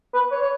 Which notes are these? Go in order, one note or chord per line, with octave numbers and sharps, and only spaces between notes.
B4
C#5
C#5